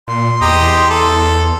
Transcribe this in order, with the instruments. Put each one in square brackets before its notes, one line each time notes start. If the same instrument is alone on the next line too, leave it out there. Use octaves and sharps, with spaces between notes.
[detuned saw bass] A#2 [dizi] C6
[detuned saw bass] E2 [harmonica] G4 D#5 A#5
[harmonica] A4